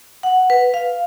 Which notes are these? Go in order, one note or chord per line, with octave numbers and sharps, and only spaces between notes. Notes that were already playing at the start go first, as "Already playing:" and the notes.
F#5
B4
F5